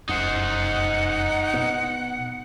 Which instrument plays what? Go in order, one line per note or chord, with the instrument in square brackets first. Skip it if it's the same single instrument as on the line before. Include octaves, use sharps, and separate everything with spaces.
[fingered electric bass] F1 F#2 [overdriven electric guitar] D#4 C5 [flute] F#5
[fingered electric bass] B2 B3